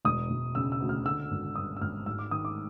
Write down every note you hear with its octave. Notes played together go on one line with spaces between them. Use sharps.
E1 D#6
E1
C#3 E6
E6
D2
F6
D3 E6
G#1
G2 D#6
E6
G#1 F6
G#2 E6
D6
D#3 D#6
D6